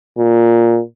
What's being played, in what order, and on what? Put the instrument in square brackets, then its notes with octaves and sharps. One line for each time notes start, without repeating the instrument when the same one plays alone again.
[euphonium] A#2